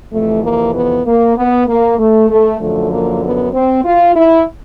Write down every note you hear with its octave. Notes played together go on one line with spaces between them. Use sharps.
F2 C3 E3 A3
A#3
B3
A#3
B3
A#3
A3
A3
F#2 D3 F3 A3
A#3
B3
C4
F4
E4